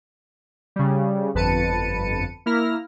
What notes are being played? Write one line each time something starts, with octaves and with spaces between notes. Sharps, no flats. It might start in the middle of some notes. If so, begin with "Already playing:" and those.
C#3 G3
G1 F2 B4 A5 C#7 D#7
A#3 E4 F6 A#6